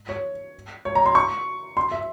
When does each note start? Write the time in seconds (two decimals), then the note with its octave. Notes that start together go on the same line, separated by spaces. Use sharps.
0.09 C#5
0.85 C#5
0.95 A#5
1.06 C6
1.15 C#6
1.77 C6
1.92 E5